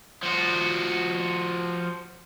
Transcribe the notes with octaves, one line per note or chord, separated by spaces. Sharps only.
F3 F#4